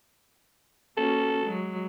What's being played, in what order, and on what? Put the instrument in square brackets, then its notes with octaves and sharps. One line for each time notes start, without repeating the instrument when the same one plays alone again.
[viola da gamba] A#3 C#4 F#4 [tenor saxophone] A4
[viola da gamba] F#3 G#3